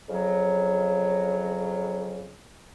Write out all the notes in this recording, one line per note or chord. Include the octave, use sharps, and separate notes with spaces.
F2 C#3 F#3